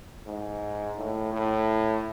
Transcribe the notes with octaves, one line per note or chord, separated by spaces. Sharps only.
G#2
A2
A2